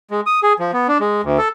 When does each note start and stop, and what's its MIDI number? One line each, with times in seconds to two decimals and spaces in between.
0.11 0.21 56
0.26 0.40 87
0.43 0.53 68
0.59 0.71 53
0.73 0.87 59
0.88 0.98 62
1.00 1.21 56
1.23 1.38 38
1.38 1.48 69